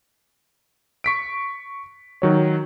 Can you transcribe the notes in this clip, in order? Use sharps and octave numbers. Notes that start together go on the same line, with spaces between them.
C#6 B6 D7
D#3 F#3 C#5